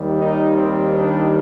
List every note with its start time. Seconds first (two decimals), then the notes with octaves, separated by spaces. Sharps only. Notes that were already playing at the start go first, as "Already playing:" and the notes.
Already playing: D#2 D#3 G3
0.20 D#4
0.57 C4
0.95 D4